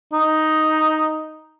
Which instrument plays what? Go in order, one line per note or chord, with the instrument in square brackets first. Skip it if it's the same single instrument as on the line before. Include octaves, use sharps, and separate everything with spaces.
[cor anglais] D#4